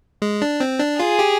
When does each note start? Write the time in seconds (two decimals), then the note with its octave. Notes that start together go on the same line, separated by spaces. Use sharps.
0.22 G#3
0.42 D4
0.60 C4
0.79 D4
1.00 F4 G#4
1.19 G4